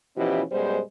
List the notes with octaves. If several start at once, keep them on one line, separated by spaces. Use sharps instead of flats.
B2 E3 F3 C#4 E4 G4
F#2 B2 G3 G#3 C5